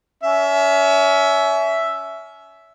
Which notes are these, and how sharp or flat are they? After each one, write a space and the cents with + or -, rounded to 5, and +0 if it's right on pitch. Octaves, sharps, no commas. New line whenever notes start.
C#4 +30 E5 +0